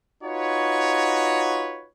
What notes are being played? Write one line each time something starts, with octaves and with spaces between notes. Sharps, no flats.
D#4 F4 F#4 B4 C#5